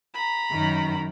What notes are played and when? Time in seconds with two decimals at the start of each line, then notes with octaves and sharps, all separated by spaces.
0.14 A#5 B5
0.52 F#2 D#3